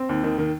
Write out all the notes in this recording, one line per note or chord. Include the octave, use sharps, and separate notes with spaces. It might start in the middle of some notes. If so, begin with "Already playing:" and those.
Already playing: C4
D#2
D#3
D#3